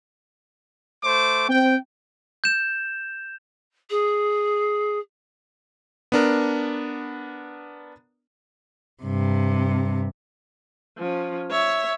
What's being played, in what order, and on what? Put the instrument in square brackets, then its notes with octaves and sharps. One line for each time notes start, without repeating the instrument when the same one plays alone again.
[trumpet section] A3 C5 D6
[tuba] C4 [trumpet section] G5
[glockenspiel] G6 E7
[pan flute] G#4
[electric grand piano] B3 D4 A#4
[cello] G2 C3
[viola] F3 C#4
C#5 E5